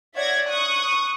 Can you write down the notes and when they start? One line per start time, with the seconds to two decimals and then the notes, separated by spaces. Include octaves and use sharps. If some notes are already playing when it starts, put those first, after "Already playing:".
0.15 C#5 D5 E5 F#5 G#6 A#6
0.48 C#6 D#6 F#6